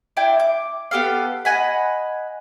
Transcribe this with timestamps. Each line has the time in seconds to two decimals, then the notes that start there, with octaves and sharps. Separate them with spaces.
0.17 D4 E4 G5
0.40 D6
0.91 B3 G4 A4 F5
1.45 D#5 F#5 G#5 B5